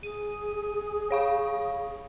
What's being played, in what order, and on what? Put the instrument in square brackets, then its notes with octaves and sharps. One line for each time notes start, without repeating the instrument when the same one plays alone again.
[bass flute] G#4 [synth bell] D#7
[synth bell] C#5 F5 C#6